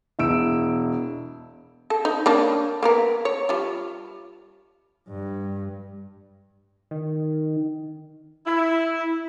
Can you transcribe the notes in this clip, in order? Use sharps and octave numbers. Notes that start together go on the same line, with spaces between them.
E1 E4 E6 D7
A4
D#4
A#3 C#4 D4
A#3 B3 A#4
C#5
G3 F4
G2
D#3
E4